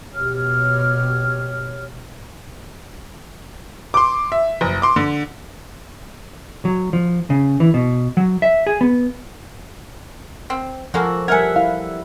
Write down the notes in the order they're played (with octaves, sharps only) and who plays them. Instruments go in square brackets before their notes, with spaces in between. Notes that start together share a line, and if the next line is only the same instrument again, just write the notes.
[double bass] B2 [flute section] G4 C#5 F6
[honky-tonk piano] C6 D6
E5
F#1
C6 D6
D3
[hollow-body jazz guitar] F#3
F3
C#3
E3
B2
F#3
E5
G#4
B3
[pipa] C4
[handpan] F3 A4 [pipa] G#3 A#3 F#4
[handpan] G3 E5 F#5 [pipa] A#4 G#5 [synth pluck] G#6 C#7
[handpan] E4 [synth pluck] F5